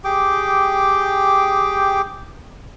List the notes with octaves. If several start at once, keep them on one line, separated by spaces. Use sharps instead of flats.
G4 G#4 G5 D6